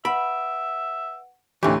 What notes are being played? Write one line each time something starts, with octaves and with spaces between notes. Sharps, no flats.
B4 E5 F#5 B5 D7
D2 A2 E3 G4 B5